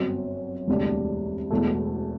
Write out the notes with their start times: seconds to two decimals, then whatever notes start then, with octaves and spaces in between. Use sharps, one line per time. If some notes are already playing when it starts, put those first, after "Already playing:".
Already playing: G1 F#2 F#3 C4 F#4
0.67 E1 D2 C3 G3 D4
1.50 E1 E2 B2 A3